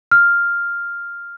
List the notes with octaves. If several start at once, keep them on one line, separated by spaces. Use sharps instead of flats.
F6